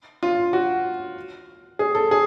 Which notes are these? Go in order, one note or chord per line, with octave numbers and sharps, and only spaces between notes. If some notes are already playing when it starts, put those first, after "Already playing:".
F4
F#4
G#4
A4
G#4